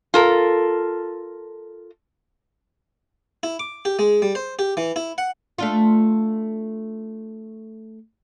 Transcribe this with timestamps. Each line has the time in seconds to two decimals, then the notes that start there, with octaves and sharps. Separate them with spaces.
0.14 F4 A4 A#4
3.43 E4
3.59 D6
3.85 G4
3.99 G#3
4.22 G3
4.35 C5
4.59 G4
4.77 E3
4.96 E4
5.18 F#5
5.58 A3 D4 F4